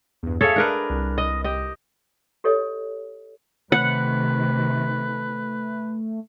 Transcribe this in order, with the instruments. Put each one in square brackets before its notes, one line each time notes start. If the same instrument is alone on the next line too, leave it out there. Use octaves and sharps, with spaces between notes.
[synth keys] E2 G2
[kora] G#4 A4 C#5 [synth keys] E5 F5
[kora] D4 A#4 B4
[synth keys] C2
[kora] D#5
G4 D#5
[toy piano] G4 A4 C#5 D#5
[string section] C3 D#3 [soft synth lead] A3 [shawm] B4 [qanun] F#5